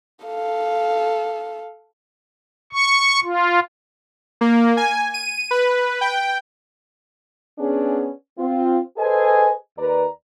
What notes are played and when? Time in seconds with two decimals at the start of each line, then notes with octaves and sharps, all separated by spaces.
0.25 A4 F5
2.73 C#6
3.24 F4
4.41 A#3
4.77 G#5
5.14 D#7
5.51 B4
6.01 G5
7.59 B3 C#4 D4 G#4
8.38 C4 F4
8.98 G#4 A4 B4 C5 D#5 G#5
9.77 D#2 B4 D5 A#5